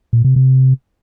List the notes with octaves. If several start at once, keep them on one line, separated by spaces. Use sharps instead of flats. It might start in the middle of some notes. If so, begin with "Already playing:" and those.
A#2
C3
C3